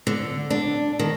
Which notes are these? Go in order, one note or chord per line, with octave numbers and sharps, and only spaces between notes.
D3
D4
D#3